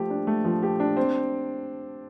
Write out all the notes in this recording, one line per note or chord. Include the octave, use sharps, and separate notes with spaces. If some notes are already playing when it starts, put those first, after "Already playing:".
Already playing: F3 A3 G4
D4
A3
F3
G4
D4
C4